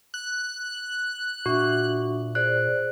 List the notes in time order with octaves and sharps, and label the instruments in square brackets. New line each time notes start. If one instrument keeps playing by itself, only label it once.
[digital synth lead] F#6
[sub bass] A#2 [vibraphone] D4 E5 [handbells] F#4
[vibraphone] G#4 C5 D5 [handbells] F#6